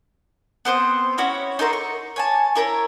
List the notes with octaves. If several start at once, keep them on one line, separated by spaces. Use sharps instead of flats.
B3 C4 C5 D#6
C#4 E4 F#4 C#5
D#4 A4 A#4 C6
C#6
C#5 G#5 A5
E4 A#4 C5 C#5